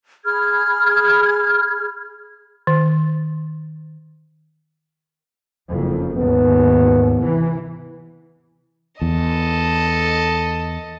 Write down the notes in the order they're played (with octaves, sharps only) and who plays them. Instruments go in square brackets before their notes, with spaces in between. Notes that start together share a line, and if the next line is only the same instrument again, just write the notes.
[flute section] G#4 B5 F6 G#6
[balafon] D#3
[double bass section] F#1 F2
[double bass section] D#2 G#2 [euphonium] B3
[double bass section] C3 E3
[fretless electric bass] E2 [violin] A4 D#5